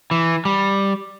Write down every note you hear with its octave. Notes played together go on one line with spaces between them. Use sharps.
E3
G3